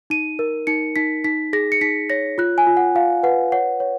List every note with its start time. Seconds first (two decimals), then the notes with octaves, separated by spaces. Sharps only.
0.10 D#4 D#7
0.39 A#4
0.67 D#4 C#7
0.96 D#4 B6
1.24 D#4 B6
1.53 G#4 A#6
1.72 C#7
1.81 D#4 B6
2.10 C#5 A#6
2.38 F4 F#6
2.58 G#5
2.67 F4
2.77 F#5
2.95 F4 F5
3.23 B4 F#5
3.52 C#5 F#5
3.80 C#5